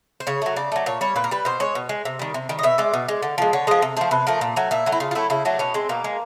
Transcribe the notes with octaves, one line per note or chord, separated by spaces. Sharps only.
C5
C#3 C#5
F#3 A3
C#3 D5
F#3 A3
A#2 C#5
G3 C#5
A#2 B4
A#4
G3 B4
B2 C5
G#3 C#5
B2
G#3
C3
D#3 G3
C3
D#3 G3
D#5
B2 E5
G#3 D5
B2
G#3
D3
F3 G#3
D3 C#5
F3 G#3 D#5
C3
F3 A3 C5
C3 B4
F3 A3 A#4
A#2
F#3 A3
A#2 E4
F#3 A3
E4
C#3 F4
F4
F#3 A3 E4
C#3 E4
F#3 A3 D4
B2 C#4
G#3 C4
B2 A#3
G#3